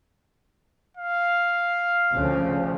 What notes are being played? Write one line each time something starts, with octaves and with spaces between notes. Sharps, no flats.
F5
D2 C#3 F3